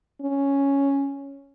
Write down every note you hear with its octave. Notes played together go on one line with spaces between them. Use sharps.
C#4